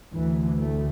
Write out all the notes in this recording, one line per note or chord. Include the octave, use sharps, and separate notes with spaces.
D2 E3
A3